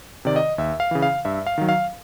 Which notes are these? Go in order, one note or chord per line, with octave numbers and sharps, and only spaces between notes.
C3 D#3 D5
D#5
D#2 E5
F5
C#3 E3
F5
G2 E5
F5
D#3 F#3
F5